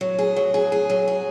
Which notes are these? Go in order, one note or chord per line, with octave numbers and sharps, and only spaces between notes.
F#3
G#4
F#3
G#4
G#4
F#3
G#4